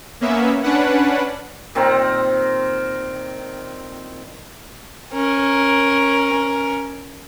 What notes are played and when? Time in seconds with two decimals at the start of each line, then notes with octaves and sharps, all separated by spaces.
0.21 A#3 B3 C#4 E5
0.63 C#4 D4 B4 F#5
1.75 A#2 D#3 C4 A#5
5.12 C#4 A#4